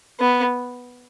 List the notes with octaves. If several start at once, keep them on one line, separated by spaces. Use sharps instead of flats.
B3